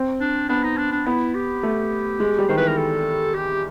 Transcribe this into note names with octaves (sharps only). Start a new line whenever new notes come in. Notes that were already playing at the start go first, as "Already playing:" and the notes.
Already playing: C4
D4
B3 D4
D#4
D4
D4
B3 E4
G4
A3
G#3
G3
D#3 C5
E3 B4
A#4
A4
G4